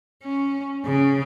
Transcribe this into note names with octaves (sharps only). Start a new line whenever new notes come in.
C#4
C#3